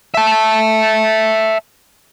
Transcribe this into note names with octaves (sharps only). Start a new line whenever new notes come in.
E5 A5